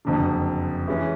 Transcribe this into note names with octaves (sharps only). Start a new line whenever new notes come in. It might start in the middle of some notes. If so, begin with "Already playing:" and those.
F#1 F2 D3
E3 G#3 C#4